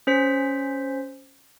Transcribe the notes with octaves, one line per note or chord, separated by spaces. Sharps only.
C#4 C5 B6